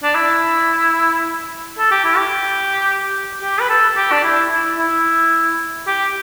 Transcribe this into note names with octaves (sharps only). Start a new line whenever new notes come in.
D4
E4
A4
G4
E4
G4
G4
B4
A4
G4
D4
E4
E4
E4
G4